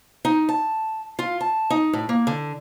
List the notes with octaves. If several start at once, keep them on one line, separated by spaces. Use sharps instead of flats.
D#4
A5
F4
A5
D#4
A2
A#3
D3